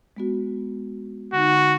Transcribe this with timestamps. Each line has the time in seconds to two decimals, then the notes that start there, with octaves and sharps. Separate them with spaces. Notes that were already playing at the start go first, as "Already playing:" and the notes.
0.17 G#3 B3 F#4
1.33 D3 D#4 F#4